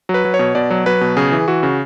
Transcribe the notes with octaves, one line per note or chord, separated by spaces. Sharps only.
F#3
B4
F#3
C#5
B2
B2 D5
F#3
F#3 B4
B2
C#3 G#4
E3
E3 F#4
C#3